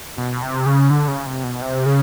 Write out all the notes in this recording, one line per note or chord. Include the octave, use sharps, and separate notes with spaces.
B2
C3
C#3
D3
C#3
C3
B2
C3
C#3